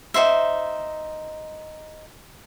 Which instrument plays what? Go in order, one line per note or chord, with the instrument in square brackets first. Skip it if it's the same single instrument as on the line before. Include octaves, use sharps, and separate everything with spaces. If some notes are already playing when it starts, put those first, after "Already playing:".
[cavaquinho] D#4 F#4 C5 E5